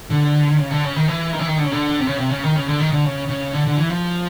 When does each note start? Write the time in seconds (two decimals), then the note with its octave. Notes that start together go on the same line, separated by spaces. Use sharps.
0.10 D3
0.58 C#3
0.71 D3
0.84 C#3
0.96 D#3
1.08 E3
1.33 D#3
1.39 E3
1.47 D#3
1.58 D3
1.64 C#3
1.72 D3
1.99 C3
2.07 C#3
2.18 C3
2.30 C#3
2.44 D#3
2.56 C#3
2.68 D3
2.80 D#3
2.91 D3
3.05 C#3
3.28 C#3
3.53 D3
3.66 D3
3.77 E3
3.89 F3